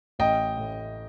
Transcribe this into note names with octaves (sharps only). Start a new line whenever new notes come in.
A1 D#5 G5
A2